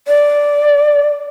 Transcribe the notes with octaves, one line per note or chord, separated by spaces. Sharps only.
D5